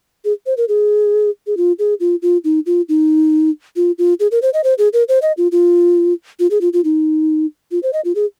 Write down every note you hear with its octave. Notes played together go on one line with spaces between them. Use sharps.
G#4
C5
A#4
G#4
G#4
F4
G#4
F4
F4
D#4
F4
D#4
F4
F4
G#4
A#4
C5
D#5
C5
G#4
A#4
C5
D#5
F4
F4
F4
G#4
F4
F4
D#4
F4
C5
D#5
F4
G#4